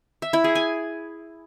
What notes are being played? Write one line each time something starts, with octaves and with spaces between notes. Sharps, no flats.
E5
E4
G#4
G#5